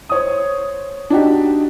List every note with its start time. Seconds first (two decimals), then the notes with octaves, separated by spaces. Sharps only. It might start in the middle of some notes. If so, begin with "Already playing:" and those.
0.09 C5 C#5 D#6
1.10 D4 D#4 F#4 G4